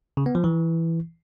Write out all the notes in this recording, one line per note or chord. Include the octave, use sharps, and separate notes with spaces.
C#3
B3
F3
E3